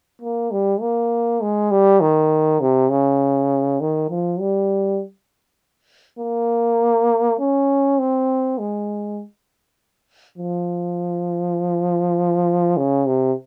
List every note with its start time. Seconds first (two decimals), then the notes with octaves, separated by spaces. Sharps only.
0.22 A#3
0.51 G3
0.81 A#3
1.41 G#3
1.71 G3
2.01 D#3
2.61 C3
2.91 C#3
3.81 D#3
4.10 F3
4.40 G3
6.19 A#3
7.39 C#4
7.99 C4
8.59 G#3
10.38 F3
12.77 C#3
13.06 C3